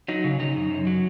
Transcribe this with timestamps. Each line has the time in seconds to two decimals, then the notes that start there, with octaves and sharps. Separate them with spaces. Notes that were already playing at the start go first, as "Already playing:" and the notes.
0.08 F#3 D#4
0.24 C#3
0.40 C#3 D#4
0.56 F#2
0.70 F#2
0.87 F#3